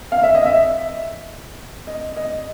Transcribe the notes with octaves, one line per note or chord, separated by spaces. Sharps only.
F5
E5
D#5
E5
D#5
D#5